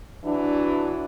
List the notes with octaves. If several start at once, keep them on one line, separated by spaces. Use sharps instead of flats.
E3 F#3 D4